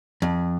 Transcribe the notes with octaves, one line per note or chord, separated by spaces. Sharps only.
F2